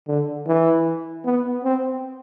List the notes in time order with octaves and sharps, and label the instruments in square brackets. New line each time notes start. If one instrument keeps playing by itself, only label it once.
[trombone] D3
E3
B3
C4